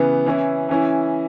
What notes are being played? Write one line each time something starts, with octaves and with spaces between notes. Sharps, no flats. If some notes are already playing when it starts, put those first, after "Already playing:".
Already playing: C#3 E3 B3
E3 C#4 E4
E3 C#4 E4